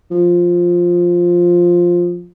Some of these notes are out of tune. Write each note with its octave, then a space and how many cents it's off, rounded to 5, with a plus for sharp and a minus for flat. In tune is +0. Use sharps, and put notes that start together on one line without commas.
F3 +5